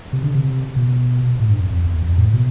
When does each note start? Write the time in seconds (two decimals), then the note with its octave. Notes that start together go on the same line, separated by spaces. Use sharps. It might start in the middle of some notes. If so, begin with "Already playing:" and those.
0.13 C3
0.23 D3
0.35 C3
0.76 B2
1.40 A2
1.50 G2
1.60 F2
1.70 F2
1.87 E2
2.02 F2
2.18 A2
2.33 B2